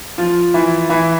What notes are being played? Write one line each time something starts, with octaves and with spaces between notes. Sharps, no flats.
F3 F4
E3 E4
E3 E4